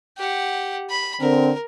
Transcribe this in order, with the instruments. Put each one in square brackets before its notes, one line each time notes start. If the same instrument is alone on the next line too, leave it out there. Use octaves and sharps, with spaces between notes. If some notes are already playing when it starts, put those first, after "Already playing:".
[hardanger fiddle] G4 F#5
B5
[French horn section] D3 C4 [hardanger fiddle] A#4